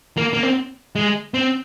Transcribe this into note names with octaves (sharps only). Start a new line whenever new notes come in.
A#3
A#3
C4
G#3
C4